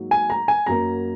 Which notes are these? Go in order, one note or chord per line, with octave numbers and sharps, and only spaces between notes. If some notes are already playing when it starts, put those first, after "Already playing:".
Already playing: G#2 F#3 A#3
G#5
A#5
G#5
F#2 F#3 A#3 A#5